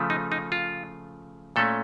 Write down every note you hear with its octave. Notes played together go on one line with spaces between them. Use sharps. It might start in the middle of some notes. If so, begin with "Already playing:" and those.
Already playing: C#3 F3 A3
D#4
D#4
F4
A#2 A3 C#4 A4